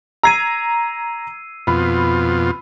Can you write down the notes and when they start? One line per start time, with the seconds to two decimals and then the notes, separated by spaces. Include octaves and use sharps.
0.23 A#5 E6 G#6 C7 D#7
1.67 F2 B2 F4 B5